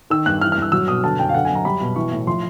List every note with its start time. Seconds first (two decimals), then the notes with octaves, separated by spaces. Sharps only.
0.10 D#3 E6
0.26 G2 F#6
0.41 E3 F6
0.52 F6
0.57 G2 E6
0.72 F#3 E6
0.88 B2 D#6
1.04 D3 A5
1.19 F#2 G5
1.29 F5
1.34 D3 F#5
1.45 G#5
1.50 F#2
1.55 A#5
1.65 G3 B5
1.81 B2
1.96 E3 C#6
2.12 A2
2.27 F3 C6